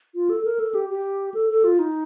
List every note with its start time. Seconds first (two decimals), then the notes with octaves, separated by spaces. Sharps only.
0.15 F4
0.30 A4
0.45 A#4
0.59 A4
0.75 G4
0.90 G4
1.34 A4
1.49 A4
1.64 F4
1.79 D#4